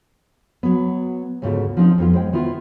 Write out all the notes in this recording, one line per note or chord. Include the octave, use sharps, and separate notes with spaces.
F#3 B3
D2 G#2 C#3 B3 F4 A4
F3 C4 D#4
F2 B3 F4
G#3 C5 G5
D#3 B3 E4 F4